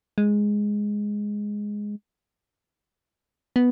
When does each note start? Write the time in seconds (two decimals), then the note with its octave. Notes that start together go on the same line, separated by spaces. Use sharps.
0.18 G#3
3.56 B3